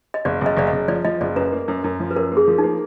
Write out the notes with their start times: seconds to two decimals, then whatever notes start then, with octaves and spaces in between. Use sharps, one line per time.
0.14 D#5
0.25 F#1 D5
0.41 F#1 D#5
0.57 F#1 D5
0.67 D#5
0.72 F#1
0.88 F3 D5
1.05 F3 D#5
1.21 F#1 D5
1.36 F#2 B4
1.52 A#3
1.68 F#2
1.84 F#2
2.00 F3
2.11 B4
2.16 F#2 A#4
2.32 A#3
2.37 G#4
2.48 F3
2.58 D#4
2.63 A#3